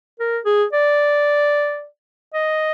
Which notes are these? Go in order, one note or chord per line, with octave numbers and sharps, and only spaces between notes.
A#4
G#4
D5
D#5